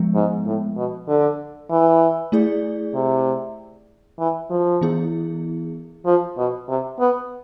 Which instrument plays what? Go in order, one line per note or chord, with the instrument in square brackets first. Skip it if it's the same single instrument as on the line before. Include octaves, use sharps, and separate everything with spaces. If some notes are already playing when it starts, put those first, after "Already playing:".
Already playing: [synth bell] F3 G#3 B3
[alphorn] G#2
A2
B2
D3
E3
[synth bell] A3 E4 G#4 D5
[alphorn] C3
E3
F3
[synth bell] E3 B3 E4 G#4
[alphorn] F3
B2
C3
B3